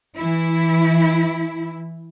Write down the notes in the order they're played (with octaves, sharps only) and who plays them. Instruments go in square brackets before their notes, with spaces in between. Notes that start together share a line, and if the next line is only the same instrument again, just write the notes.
[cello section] E3 E4